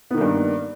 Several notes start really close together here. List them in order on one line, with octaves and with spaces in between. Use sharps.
B3 D#3 A#3 G2